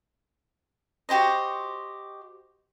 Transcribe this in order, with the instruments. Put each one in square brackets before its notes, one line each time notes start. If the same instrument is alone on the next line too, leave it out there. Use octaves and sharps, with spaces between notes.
[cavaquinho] F#4 G4 C5 D#5